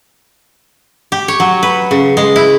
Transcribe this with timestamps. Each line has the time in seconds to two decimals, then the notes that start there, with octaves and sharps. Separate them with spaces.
1.12 G4
1.28 C#5
1.40 F#3
1.63 B4
1.91 C#3
2.17 G#3
2.36 E4